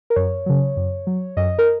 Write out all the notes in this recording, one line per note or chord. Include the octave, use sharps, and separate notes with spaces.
A#4
F#2 C#5
C#3 F#3
F#2
F#3
F#2 D#5
A#4